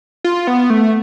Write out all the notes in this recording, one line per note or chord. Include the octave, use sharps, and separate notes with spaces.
F4
B3
A3